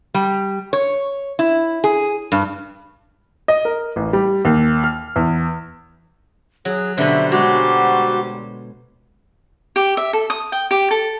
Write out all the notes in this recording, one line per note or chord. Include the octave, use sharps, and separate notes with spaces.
G3
C#5
E4
G#4
G2
D#5
A#4
A1
G3
D#2
F6
E2
F#3 G#4
B2 D3 F#3 G3 C5 E5
G#3 F#4 D6
G4
E5
A4
D#6
G5
G4
A4